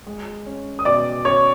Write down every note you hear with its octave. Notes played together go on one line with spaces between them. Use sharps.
G#3
C#4
D#6
B2 D5 D6
C#4 C#5 C#6